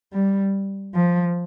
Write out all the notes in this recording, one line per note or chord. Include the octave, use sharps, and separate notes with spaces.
G3
F3